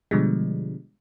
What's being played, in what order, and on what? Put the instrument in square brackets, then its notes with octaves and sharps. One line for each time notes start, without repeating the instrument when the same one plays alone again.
[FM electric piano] B2 D3 F3 G3 G#3